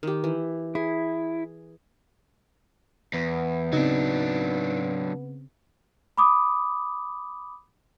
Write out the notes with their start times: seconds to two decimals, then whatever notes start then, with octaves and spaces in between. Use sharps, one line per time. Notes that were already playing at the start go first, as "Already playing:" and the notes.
0.03 D#3 G4
0.24 E3
0.75 E4 G#4
3.14 E2 B3
3.73 C#3 F#3 C4 D4 D#4
6.18 B5 D6 D#6